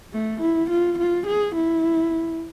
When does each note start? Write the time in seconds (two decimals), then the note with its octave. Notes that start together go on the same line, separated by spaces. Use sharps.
0.13 A3
0.41 E4
0.70 F4
0.98 F4
1.26 G#4
1.55 E4